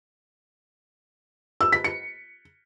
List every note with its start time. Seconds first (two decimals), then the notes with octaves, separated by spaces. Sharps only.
1.61 E6
1.72 B6
1.84 C#7